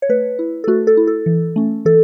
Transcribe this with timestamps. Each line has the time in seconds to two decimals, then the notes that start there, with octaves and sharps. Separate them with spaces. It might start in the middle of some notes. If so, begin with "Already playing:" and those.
0.02 C#5
0.09 A3 B4
0.39 E4
0.64 A4
0.67 A3 F#4
0.87 A4
0.97 E4
1.07 A4
1.26 E3
1.56 A3 C#4
1.85 E3 A4